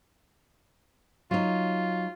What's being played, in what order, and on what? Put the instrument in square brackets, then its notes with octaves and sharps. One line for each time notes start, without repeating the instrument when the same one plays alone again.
[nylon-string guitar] F#3 D#4 [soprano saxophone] F4